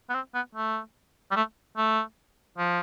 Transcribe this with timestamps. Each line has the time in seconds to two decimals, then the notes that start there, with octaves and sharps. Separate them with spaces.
0.09 B3
0.14 C4
0.34 B3
0.55 A3
1.31 G3
1.36 A3
1.77 A3
2.58 F3